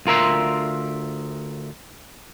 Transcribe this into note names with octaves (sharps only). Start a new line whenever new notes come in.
D2 F4 A#4 E5 C6